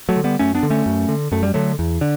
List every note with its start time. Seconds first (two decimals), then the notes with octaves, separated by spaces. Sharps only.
0.09 F#3 A3
0.17 D3
0.24 G3 B3
0.39 F#2 A3 C#4
0.55 B3 D4
0.63 D3
0.70 A3 C#4
0.86 F#2
1.09 D3
1.32 F#2 A3
1.43 G3
1.54 D3 F#3 A3
1.79 E2
2.01 D3